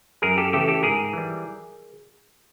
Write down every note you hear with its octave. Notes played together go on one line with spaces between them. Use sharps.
F#2 G#4 A#4
G4 A4
C#3 E3 A3 G4 A4
G4 A4
G#2 G#4 A#4
E3 G3